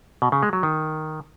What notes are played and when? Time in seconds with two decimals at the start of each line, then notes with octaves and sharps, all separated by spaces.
0.22 B2
0.32 C#3
0.43 G#3
0.53 F#3
0.63 D#3